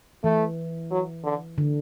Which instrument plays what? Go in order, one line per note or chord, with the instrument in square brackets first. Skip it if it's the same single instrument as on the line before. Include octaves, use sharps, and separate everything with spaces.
[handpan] E3 [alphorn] A3
[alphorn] F#3
D3
[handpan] D3